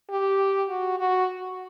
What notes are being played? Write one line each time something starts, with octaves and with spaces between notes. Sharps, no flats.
G4
F#4
F#4